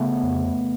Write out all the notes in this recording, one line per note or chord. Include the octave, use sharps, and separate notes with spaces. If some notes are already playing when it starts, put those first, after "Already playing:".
Already playing: C#3 A3 B3
F2